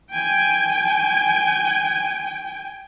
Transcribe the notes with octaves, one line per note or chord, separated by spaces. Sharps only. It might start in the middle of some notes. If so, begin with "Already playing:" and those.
G5 G#5